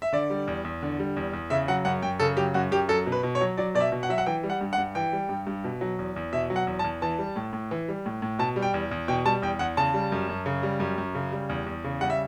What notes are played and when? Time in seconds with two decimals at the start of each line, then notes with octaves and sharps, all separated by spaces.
0.02 E5
0.13 D3 D5
0.30 G3
0.47 E2
0.64 E2
0.83 D3
0.99 G3
1.16 E2
1.33 E2
1.50 C#3 E5
1.68 F#3 F#5
1.85 F#2 F#5
2.02 F#2 G5
2.20 C#3 A4
2.37 F#3 G4
2.54 F#2 F#4
2.71 F#2 G4
2.89 F#3 A4
3.06 B2
3.12 B4
3.23 B2
3.35 C#5
3.41 F#3
3.57 F#3 D5
3.75 B2 D5
3.80 E5
3.92 B2
4.03 F#5
4.09 F#3 E5
4.18 F#5
4.26 E3 G5
4.43 G3
4.50 F#5
4.61 G2
4.73 F#5
4.78 G2
4.95 E3 G5
5.13 G3
5.29 G2
5.47 G2
5.64 B2
5.81 F#3
5.99 E2
6.16 E2
6.33 B2 E5
6.50 F#3
6.56 F#5
6.67 E2
6.79 A5
6.84 E2
7.02 E3 A5
7.19 G3
7.36 A2
7.53 A2
7.71 E3
7.88 G3
8.06 A2
8.22 A2
8.39 B2 A5
8.56 G3
8.62 G5
8.74 E2
8.91 E2
9.08 B2 G5
9.25 G3 A5
9.42 E2 G5
9.59 E2 F#5
9.77 C#3 A5
9.94 G3
10.12 F#2
10.29 F#2
10.46 C#3
10.63 G3
10.80 F#2
10.98 F#2
11.15 C#3
11.32 G3
11.49 E2
11.66 E2
11.84 C#3
12.01 G3 F#5
12.10 E5